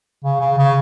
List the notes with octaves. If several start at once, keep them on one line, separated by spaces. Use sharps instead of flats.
C#3
C#3
C#3